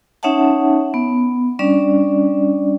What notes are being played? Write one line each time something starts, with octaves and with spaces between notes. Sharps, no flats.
C#4 D#4 C#5 E5 F#5 A5
B3
G3 C#4 D4 D5